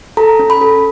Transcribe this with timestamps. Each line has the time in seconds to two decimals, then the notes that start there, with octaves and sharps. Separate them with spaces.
0.17 A4 A#5
0.39 C#4
0.50 B5
0.61 A4